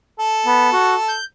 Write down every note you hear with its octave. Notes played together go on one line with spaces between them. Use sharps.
A4
B3
F#4
G6